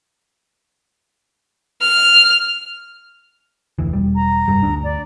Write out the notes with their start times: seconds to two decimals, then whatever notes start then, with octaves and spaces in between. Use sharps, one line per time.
1.80 F6
3.79 F1 D2 E3
3.93 E1 G3
4.16 A#5
4.48 F1 G2 G3
4.63 D2 D4
4.84 D5